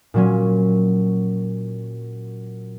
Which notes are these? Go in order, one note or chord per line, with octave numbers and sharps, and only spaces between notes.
A#2 F#3 C#4